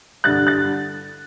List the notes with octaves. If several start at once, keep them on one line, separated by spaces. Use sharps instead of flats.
G2 D3 G3 F#6 A6
F#6 A6